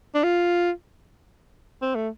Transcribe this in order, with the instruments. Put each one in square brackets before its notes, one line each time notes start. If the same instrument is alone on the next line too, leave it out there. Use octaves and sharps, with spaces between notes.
[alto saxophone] D4
F4
C4
A3